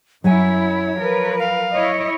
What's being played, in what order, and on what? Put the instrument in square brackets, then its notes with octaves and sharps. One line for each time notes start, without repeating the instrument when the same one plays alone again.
[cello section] F#2 E4 [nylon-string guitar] F#3 E5 G#5 [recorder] C#5
[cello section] F3 A#4 B4
[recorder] F5
[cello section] E4 C#5 D#5